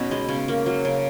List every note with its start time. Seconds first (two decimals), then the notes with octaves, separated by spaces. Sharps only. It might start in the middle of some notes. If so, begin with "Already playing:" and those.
Already playing: B2 B3 C#4 D#4
0.11 G#3
0.28 C#3 C#4
0.48 A#3
0.66 F#3
0.85 C#3